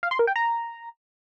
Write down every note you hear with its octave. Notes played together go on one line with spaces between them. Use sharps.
F5
C6
A#4
G5
A#5